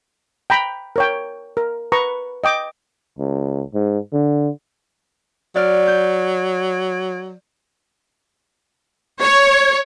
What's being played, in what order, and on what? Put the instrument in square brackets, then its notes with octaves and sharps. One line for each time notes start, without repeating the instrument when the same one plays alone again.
[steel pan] G5 A#5 B5
A#4 C#5 G5
A#4
B4 A#5 C#6
D#5 G5 D6
[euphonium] C#2
G#2
D3
[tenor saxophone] F#3 [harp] D5 F6
[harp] G6
[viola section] C#5